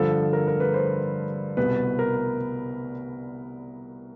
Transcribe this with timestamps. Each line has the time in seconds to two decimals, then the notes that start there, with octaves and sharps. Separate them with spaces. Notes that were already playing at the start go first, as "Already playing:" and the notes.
Already playing: G2 D3 F3 A4
0.33 A#4
0.48 A#4
0.60 B4
0.74 C5
1.57 C2 B2 B4
1.99 A#4